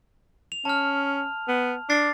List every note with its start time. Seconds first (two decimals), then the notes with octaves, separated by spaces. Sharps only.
0.52 F7
0.65 C#4 A5 F6
1.49 B3
1.90 D4 D6 A6 C7